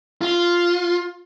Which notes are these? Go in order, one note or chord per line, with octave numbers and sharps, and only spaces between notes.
F4